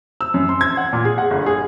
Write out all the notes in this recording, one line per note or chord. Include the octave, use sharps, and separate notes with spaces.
E6
F#2
C6
G#6
F#5
A#2
G#4
F#5
G1
G#4